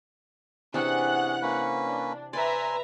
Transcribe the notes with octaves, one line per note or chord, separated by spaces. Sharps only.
C3 E3 C#4 D4 G#4 F#5 F#6
A#3 C#4 B4
D4
B4 D5 E5 G#5 A#5 C6